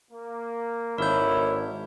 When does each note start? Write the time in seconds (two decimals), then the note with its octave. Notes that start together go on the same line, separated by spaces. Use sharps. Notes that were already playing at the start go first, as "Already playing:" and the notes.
0.12 A#3
0.98 G#1 D4 E4 A4 A#4 C#5 G6